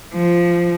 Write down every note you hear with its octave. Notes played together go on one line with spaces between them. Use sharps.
F3